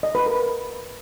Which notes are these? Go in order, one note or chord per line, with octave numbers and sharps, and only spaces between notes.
D#5
B4
A#4